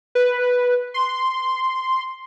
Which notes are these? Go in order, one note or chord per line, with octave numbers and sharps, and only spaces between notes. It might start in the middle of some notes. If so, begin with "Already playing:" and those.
B4
C6